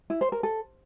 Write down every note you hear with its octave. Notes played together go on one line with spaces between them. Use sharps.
E4
C5
A#4
A4